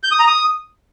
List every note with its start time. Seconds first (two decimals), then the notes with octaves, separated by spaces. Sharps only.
0.03 G6
0.11 D#6
0.19 A#5
0.27 D#6